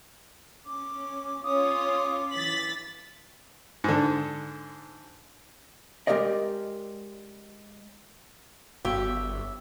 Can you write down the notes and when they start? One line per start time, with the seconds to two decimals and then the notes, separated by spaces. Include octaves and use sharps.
0.66 C#4 D6
1.44 C#4 F4 C#5 D6 D#6
2.31 E3 A6 B6 F#7
3.84 G#2 D3
6.07 G#3 A#3 G4 A#4 D5 D#5
8.85 G1 B3 F#4 G4 C#5 E5 F5